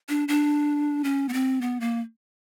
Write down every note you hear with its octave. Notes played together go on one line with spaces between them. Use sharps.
D4
D4
C#4
B3
C4
B3
A#3